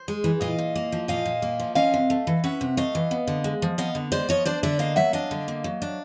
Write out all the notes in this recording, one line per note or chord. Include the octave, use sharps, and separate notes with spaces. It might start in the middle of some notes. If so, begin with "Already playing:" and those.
Already playing: C5
G#3
E3
A#2 D#5 F5
A#2
A#3
F3
A#2 D#5 F5
A#2
A#3
F3
C#4 D#5 F5
C3
A3
E3
C#4 E5 F#5
C3
A3 D#5 F5
E3
B3
D3
G#3
F3
B3 D#5 F5
D3
G#3 C5 D5
F3 C#5 D#5
D4 C5 D5
D3 D5 E5
A#3 D#5 F5
F#3 E5 F#5
D4 D#5 F5
D3
A#3
F#3
D4